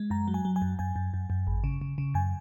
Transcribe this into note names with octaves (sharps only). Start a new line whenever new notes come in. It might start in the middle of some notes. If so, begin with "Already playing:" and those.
Already playing: G#3
F#2 A#5
F#3
G#5
F#3
G#5
F#2
F#2 G#5
F#2
F#2
F#2
G#1
C#3
C#3
C#3
F#2 G#5